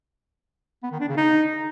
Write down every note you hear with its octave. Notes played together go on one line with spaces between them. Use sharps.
B3
D#3
D4
C#3
D#4